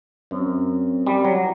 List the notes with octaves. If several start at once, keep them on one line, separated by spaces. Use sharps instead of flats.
F#2 C4
G3
F#3